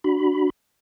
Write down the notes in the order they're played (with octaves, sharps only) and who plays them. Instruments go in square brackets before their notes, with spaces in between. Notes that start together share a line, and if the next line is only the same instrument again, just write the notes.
[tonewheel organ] D4 F#4 B5